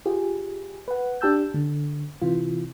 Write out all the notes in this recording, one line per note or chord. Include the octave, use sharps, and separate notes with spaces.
F4 G4 G#4
B4 F#5
D4 G4 A5 E6 G6
D3
C3 E3 F4